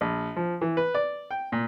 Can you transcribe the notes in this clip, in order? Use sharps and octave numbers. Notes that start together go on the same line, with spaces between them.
A#1
F3
E3
B4
D5
G5
A#2